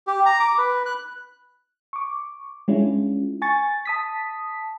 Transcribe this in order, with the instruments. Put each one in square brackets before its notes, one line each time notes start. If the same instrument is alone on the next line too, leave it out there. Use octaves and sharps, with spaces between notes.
[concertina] G4
A#5
D6
B4
F#6
[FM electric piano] C#6 D6
G#3 C#4 D4 E4 F4
G#5 C#6 A6
A5 D#6 B6